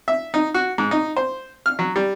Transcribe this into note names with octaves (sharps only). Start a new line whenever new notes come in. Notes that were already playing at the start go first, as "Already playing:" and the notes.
E5
D#4
F#4
G#2
D#4
C5
F6
F#3
G3